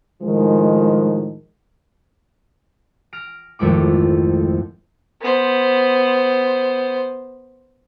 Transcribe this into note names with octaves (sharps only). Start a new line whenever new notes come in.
A2 D#3 F3 G#3
F6 A#6 D7
G#1 F2 A3 E4 D6
B3 C5